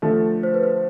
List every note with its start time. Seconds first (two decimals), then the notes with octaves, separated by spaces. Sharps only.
0.02 D3 F3 A3
0.43 C5
0.54 B4
0.63 C5